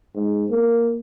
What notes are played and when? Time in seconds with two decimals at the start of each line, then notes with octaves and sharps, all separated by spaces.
0.15 G#2
0.50 A#3